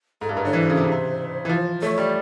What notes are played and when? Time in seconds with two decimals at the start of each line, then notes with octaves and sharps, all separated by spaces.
0.21 G#2 A4
0.29 G2 A#4
0.37 G#2 B4
0.45 D3 C#5
0.53 E3 C5
0.70 C#3
0.77 C3
0.85 C#3
0.92 C3
1.45 E3
1.49 F3
1.82 A3 C#5
1.98 G3